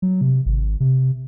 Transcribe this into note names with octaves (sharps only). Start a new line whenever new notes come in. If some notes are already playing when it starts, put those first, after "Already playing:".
F#3
C3
G#1
C3